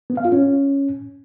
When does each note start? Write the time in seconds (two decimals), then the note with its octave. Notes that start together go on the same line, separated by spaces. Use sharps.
0.10 B3
0.17 F5
0.25 F4
0.32 C#4